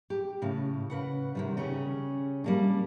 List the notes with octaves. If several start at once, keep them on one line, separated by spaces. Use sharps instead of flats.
G4
A2 C#3
C#3 B4 F#5
C3 D#3 G3
C#3 C#4 G4 G#4
G3 A#3 D4